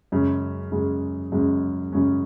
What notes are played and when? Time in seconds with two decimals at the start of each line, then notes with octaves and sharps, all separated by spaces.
0.12 F#2 C#3 G#3 C#4
0.72 F#2 C#3 G#3 C#4
1.32 F#2 C#3 G#3 C#4
1.93 F#2 C#3 G#3 C#4